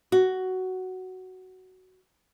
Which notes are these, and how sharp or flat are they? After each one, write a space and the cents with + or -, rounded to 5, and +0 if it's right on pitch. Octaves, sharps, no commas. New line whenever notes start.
F#4 +10